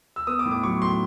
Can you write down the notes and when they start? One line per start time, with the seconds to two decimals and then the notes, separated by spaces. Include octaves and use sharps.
0.16 E6
0.27 B3 D#6
0.39 D6
0.45 A2
0.51 D6
0.63 F#3 C#6
0.82 A2 C6